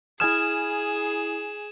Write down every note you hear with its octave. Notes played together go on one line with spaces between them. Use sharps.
E4 G#4 G#5 D#6 F6 E7